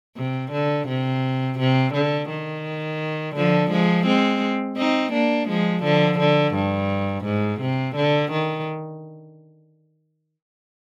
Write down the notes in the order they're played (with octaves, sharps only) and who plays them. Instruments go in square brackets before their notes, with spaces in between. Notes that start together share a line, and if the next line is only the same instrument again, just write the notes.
[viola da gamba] C3
D3
C3
C3
D3
D#3
D3 F3
F3 G#3
G#3 C4
C4 D#4
A#3 D4
F3 G#3
D3 F3
D3
G2
G#2
C3
D3
D#3